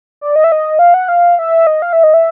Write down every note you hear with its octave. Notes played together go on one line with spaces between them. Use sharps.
D5
D#5
E5
D#5
F5
F#5
F5
E5
D#5
F5
E5
D#5
E5